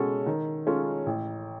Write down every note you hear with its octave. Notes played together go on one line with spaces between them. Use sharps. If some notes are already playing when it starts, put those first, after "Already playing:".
Already playing: B2 G#3 C#4 F#4 A4
D#3
G#3 C#4 F4 A4
A1